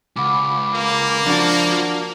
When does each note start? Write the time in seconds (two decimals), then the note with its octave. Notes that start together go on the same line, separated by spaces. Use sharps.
0.16 C#2 F#5 B5 D6
0.74 A#3
1.26 F3 D4 F#4